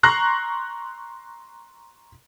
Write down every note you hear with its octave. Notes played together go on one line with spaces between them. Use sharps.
A#5 C6 C#6 F#6 A#6 C7